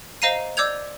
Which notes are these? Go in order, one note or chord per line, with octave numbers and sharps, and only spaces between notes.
C5 D#5 F5 A#5 C7 D#7
D5 D6 E6 G6 G#6 F7